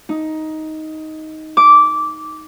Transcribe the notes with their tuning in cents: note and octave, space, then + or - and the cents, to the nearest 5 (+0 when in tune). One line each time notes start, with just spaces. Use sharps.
D#4 +10
D6 -10